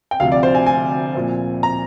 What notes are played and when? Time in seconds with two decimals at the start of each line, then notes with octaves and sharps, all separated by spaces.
0.11 G5
0.20 D2 C3 F3 F5
0.32 D5
0.43 C5
0.55 G#5
0.66 G#5
1.14 A#2 F3 C4
1.63 A#5